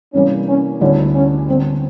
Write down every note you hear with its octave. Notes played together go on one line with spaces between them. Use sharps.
C3 E3 G3 A#3 C#4
C#4
D2 D3 G3 B3 C#4 E4
C#4
D3 G3 B3 C4